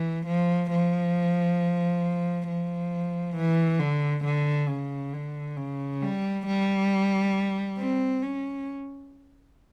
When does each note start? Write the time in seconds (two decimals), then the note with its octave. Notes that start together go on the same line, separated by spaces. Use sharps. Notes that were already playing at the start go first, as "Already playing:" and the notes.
Already playing: E3
0.26 F3
0.70 F3
2.47 F3
3.35 E3
3.79 D3
4.25 D3
4.68 C#3
5.13 D3
5.57 C#3
6.02 G3
6.46 G3
7.78 C4
8.23 C#4